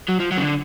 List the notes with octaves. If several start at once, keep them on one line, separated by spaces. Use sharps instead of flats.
F#3
F3
F#3
C#3
D3